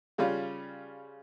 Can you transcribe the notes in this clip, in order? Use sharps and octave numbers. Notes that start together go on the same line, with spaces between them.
C#3 G3 C#4 F4